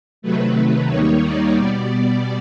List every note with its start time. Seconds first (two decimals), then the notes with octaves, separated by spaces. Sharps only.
0.22 C3 D#3 F#3 A3 B4
0.88 D#2 D#3 G3 A#3 D#4 C#5
1.22 D5
1.55 B2 G3 B3 D5